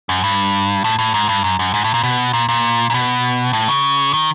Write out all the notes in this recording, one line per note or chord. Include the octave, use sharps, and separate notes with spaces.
F#2
G2
A2
A2
G#2
G2
F#2
F#2
G#2
A2
A#2
B2
A#2
A#2
A#2
B2
A2
C#3
D#3